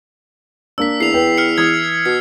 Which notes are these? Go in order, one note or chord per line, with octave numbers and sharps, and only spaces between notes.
A#3 D4 E6 B6
E2 C7 F7
B4 G5
F6 C#7
E3 D#6 G#6
B2 C7